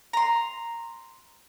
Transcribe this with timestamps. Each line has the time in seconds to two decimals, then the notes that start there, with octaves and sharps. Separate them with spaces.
0.13 A#5 C6